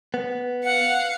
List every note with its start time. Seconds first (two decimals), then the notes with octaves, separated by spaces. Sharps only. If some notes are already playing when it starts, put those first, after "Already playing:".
0.14 B3
0.64 F5 F#5 C#7